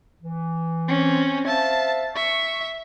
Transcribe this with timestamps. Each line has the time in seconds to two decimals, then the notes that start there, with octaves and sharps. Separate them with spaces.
0.22 E3
0.88 C4 C#4
1.47 C5 E5 F5 A5
2.16 E5 C#6